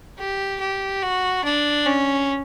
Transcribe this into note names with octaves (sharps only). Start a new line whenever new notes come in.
G4
G4
F#4
D4
C#4